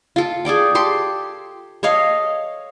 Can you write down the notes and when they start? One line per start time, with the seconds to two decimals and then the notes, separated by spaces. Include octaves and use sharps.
0.16 F4 A4
0.45 G#4 A4 D5 G5
0.75 G4 A4 C6
1.83 A4 C#5 D#5 F5